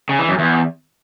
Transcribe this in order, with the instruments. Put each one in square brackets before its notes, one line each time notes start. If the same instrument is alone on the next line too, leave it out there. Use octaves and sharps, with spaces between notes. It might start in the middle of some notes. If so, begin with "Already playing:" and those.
[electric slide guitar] C#3
E3
F#2
E2